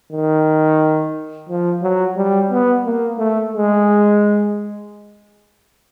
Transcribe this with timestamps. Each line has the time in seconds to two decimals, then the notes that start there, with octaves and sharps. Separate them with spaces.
0.13 D#3
1.49 F3
1.82 F#3
2.17 G3
2.51 B3
2.85 A#3
3.18 A3
3.53 G#3